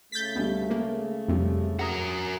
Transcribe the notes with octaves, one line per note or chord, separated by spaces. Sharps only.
C#3 A3 G6 A6 B6
D2 B2 G3
G#3 A#3
F2 C3 G3 G#3
F#4 A#4 D#6 A#6